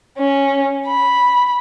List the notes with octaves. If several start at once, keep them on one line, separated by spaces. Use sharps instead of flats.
C#4
B5